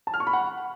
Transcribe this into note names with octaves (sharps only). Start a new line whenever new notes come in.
A5
F6
C#6
B5
F#5